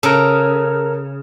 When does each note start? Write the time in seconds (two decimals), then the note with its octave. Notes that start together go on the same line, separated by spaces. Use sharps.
0.03 C#3 A4 A#4